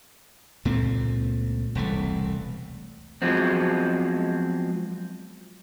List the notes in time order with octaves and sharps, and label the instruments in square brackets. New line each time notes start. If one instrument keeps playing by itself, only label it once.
[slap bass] C#2 A#2 A3 C4
E1 C2 A3
[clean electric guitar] F3 F#3 G#3 B3 C4